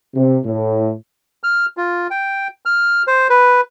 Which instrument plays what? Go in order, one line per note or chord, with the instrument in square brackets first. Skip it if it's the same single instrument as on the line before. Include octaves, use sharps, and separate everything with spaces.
[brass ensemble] C3
A2
[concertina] F6
F4
G5
F6
C5
B4